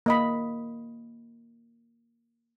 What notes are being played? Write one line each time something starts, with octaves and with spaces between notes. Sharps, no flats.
A#3 D#5 B5